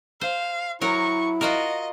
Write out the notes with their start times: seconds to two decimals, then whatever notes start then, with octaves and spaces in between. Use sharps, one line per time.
0.21 C5 F5
0.81 F#3 E4 A#4 C#6
1.41 F4 F#4 A#4 D#5